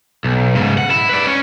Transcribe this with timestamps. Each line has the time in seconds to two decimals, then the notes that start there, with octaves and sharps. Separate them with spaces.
0.24 B1
0.55 G#2 C#3
0.78 F#5
0.91 E4
1.09 B4 D5
1.27 C#4